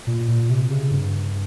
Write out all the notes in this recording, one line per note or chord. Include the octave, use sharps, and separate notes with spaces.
A#2
A#2
C3
C#3
G2